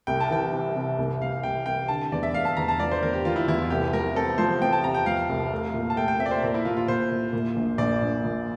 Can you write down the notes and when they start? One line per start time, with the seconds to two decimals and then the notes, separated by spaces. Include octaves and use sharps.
0.07 C2 G5
0.20 A5
0.31 E3 G5
0.53 C3
0.76 C3
0.98 C2
1.21 C2 F5
1.43 C2 G5
1.66 C2 G5
1.88 D3 A5
2.12 E2 D5
2.23 E5
2.34 E2 F5
2.45 A5
2.57 E2 A#5
2.68 A5
2.80 F3 D5
2.91 C5
3.02 E2 A#4
3.13 G4
3.25 E2 F4
3.36 E4
3.48 E2 E4
3.59 F4
3.70 C2 G4
3.93 F3 A#4
4.15 C4 A4
4.38 F3 C5
4.61 C4 G5
4.73 A5
4.84 C3 A#5
4.95 G5
5.06 F3 F5
5.29 C2
5.52 A3
5.74 A#2
5.90 A5
5.97 A3 G5
6.08 G5
6.19 C4 E5
6.26 D5
6.31 C5
6.42 A#2 A#4
6.54 E4
6.65 A#2 F4
6.77 F4
6.88 A#2 C5
7.11 A#2
7.33 A#2
7.56 A#1
7.78 A#1 D5
8.01 A#1
8.24 A#2